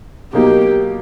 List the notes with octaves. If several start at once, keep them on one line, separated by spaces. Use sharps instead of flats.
B2 F#3 A#3 D#4 G4